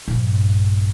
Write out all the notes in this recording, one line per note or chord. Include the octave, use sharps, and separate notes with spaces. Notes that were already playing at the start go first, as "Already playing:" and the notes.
A#1 G2